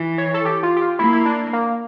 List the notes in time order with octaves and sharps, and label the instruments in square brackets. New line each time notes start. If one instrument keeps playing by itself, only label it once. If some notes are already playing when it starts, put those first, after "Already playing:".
Already playing: [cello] E3
[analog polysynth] C#5
A4
G4
F4
G4
F4
[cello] A#3 [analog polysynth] E4
[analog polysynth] E4
D4
A#3